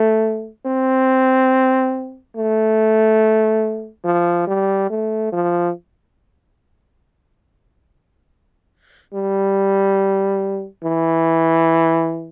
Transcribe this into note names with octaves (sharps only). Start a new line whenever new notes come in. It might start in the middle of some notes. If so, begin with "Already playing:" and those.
Already playing: A3
C4
A3
F3
G3
A3
F3
G3
E3